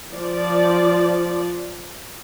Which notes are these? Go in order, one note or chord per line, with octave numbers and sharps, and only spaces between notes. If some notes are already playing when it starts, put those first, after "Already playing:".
F3 D5